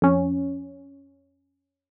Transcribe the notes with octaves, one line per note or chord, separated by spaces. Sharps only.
F2 C#4